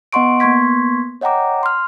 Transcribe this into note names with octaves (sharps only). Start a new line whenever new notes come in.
B3 D#5 F#5 C6 C#6 D7
A#3 B3 C6 C#6 G#6 B6
C#5 D#5 F#5 G5 A#5 D6
C6 F6